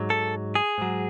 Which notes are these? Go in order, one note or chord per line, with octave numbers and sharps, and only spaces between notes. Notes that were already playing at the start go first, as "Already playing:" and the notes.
Already playing: G#2 F#3
A4
G#4
G#2 F#3